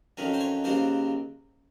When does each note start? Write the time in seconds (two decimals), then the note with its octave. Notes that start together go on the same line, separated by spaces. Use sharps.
0.17 F2 D#3 F#3 C#4
0.34 C5
0.40 C#5
0.64 D#2 C#3 F#3 C4 C5